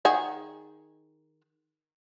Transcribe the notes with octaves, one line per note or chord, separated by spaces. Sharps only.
D#3 G#4 F#5